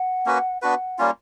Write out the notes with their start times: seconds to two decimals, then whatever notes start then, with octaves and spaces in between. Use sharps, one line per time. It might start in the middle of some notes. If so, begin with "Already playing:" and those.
Already playing: F#5
0.26 A#3 C#4 F#4 B4
0.61 B3 D4 F#4 B4 F#5
0.98 G3 A#3 C#4 F4